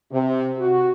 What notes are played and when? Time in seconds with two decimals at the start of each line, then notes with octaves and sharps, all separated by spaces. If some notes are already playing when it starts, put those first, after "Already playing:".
0.12 C3
0.58 F#4